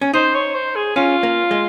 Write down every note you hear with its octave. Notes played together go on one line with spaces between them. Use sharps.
C#4
D#4 C5
C#5
C5
G#4
C#4 F4
A#3
G#3